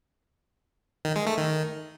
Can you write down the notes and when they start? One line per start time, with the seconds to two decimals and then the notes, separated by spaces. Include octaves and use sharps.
1.05 D#3
1.16 G#3
1.27 A3
1.38 D#3